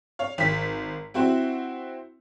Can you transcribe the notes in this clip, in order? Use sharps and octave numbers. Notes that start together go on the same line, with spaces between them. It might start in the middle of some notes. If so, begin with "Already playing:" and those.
C#5 F5
G#1 B6
C4 E4 F#4 C5